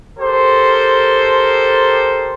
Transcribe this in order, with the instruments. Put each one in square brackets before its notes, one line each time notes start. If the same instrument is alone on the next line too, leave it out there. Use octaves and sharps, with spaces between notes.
[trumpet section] G4 A4 A#4 C5